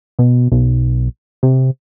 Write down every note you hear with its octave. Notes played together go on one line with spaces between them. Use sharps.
B2
B1
C3